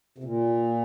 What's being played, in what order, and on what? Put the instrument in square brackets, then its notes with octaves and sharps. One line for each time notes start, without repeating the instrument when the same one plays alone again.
[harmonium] C3
A#2